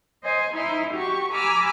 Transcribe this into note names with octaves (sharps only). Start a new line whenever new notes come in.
C5 D#5 G#5
D#4 E4 C6
F#4 G4 C#6
G#5 A#5 B5 D6 E6 F6